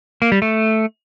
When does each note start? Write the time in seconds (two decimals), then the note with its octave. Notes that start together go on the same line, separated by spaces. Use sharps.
0.22 A#3
0.32 G3
0.42 A3